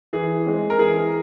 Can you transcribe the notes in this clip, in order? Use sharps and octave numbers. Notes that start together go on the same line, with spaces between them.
E3 G#4
G#3 C4
A#4
E3 G#4